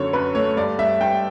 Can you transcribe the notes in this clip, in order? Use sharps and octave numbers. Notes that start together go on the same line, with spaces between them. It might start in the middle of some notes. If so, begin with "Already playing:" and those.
Already playing: F#2 D3 A4 C#5
F#2 B4
A3 C#5
G2 D5
G2 E5
G2 G5